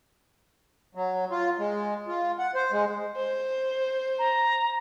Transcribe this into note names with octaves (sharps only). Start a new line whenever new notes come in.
F#3
F4
G#3
F4
F#5
C5
G#3
C5
A#5